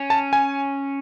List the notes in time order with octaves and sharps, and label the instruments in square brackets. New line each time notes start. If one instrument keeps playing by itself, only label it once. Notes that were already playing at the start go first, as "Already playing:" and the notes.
Already playing: [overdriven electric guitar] C#4
[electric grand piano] A5
G#5